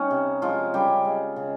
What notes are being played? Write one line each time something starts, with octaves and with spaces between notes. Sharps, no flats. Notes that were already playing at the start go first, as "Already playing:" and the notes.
Already playing: G3 C#4 D#4
C3
F3 G#3 F4
C#3 G3 G4
G#3
C#3